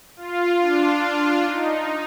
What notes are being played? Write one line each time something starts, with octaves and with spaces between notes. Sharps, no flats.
F4
D4
D4
D#4